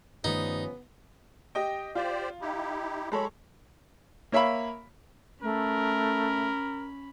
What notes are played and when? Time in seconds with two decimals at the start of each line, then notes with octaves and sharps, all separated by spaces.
0.24 G2 D#3 F3 G3 A3 B3 C#4 D#4
1.55 G4 D#5 G5
1.95 F4 G4 C5 D5
2.41 D#4 E4 G4
3.12 F#3 G#3 A4 C#5 B5
4.32 A#3 C#5 E5 F5 B5
5.42 A3 C#4 A#4 B5